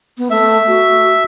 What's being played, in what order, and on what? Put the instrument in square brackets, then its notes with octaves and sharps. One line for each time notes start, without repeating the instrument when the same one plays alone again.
[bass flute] B3
[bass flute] A3 [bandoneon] E5
[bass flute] F#4